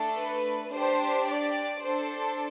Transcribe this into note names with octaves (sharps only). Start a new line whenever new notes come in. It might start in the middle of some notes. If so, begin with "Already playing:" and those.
Already playing: A3 D4 A4
B4
D4 G4 C5
D5
D4 A4 C5